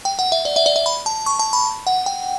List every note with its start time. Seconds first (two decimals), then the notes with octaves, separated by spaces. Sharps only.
0.05 G5
0.19 F#5
0.32 E5
0.45 D5
0.56 E5
0.66 D5
0.76 E5
0.86 B5
1.06 A5
1.26 C#6
1.39 A5
1.53 B5
1.87 F#5
2.06 G5